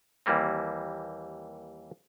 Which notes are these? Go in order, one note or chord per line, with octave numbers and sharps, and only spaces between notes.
D#2 E3 G3 A#3 C4